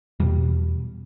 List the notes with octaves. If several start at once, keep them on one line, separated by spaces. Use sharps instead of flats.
E2 B2 G3